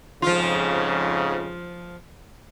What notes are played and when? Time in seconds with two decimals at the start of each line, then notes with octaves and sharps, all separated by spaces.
0.22 F2 G#2 C#3 F3 F4